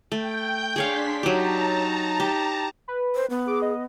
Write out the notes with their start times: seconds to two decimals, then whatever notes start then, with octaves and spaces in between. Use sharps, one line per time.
0.12 A3 G5 G6
0.76 D4 G#4 C#5 F5 C6 B6
1.23 F#3 D#4 G4 A5 A#5
2.20 G4
2.88 B4
3.15 C5
3.30 B3
3.47 G#4 D6
3.62 D#5